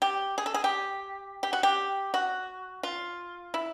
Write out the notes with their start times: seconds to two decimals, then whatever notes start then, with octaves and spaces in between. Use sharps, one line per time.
0.02 G4
0.38 G#4
0.46 A4
0.54 G#4
0.64 G4
1.43 G4
1.53 F#4
1.63 G4
2.14 F#4
2.83 F4
3.54 E4